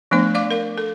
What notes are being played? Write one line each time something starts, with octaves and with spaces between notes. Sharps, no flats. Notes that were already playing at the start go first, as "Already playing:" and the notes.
F3 A3 B3 D4 C5
D5 F5 D6
A#4 F5
A4